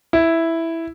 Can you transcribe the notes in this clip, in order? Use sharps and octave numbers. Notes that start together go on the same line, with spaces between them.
E4